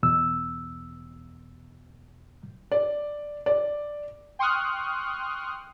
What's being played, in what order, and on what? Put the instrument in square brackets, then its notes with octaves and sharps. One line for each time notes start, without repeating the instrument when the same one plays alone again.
[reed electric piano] E2 B2 E6
[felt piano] D5
D5
[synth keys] G5 C6 C#6 D#6 F6 F#6